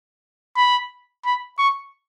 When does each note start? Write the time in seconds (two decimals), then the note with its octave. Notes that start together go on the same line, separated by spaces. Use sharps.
0.57 B5
1.25 B5
1.58 C#6